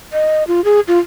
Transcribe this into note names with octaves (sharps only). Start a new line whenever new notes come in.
D#5
F4
G#4
F4